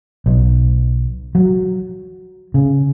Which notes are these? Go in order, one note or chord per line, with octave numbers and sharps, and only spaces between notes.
B1
F#3
C#3